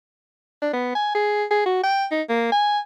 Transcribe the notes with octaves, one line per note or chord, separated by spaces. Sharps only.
D4
B3
G#5
G#4
G#4
F#4
G5
D#4
A#3
G#5